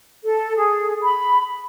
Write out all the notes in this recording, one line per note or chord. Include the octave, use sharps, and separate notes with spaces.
A4
G#4
B5